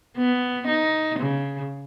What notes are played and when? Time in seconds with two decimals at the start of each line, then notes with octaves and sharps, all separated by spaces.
0.17 B3
0.67 D#4
1.19 C#3